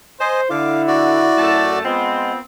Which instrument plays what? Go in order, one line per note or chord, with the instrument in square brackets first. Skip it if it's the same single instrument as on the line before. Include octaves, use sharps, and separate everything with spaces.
[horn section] C5 [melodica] D#5 G#5
[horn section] D3 [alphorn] E4 [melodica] F5 D6
[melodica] F#4 D5
[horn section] F#2 A3 A5
[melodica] G#3 [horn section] B3 C4 F4